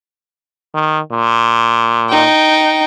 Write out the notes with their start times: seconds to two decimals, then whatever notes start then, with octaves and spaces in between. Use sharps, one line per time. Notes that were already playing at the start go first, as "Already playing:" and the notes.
0.74 D#3
1.11 A#2
2.09 D#4 G5